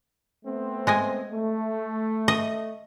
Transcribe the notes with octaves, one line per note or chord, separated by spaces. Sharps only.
A3 B3 C4
G#3 D#5 G#5
A3
D#5